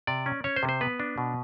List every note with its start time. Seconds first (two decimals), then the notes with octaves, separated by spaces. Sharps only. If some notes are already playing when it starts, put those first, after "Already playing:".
0.07 C3 D5
0.26 C#4
0.44 C#4 C#5
0.56 C5
0.63 C3
0.69 C5
0.81 B3 B4
1.00 D4
1.18 B2